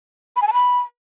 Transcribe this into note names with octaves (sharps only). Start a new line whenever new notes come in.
B5
G#5
A5
B5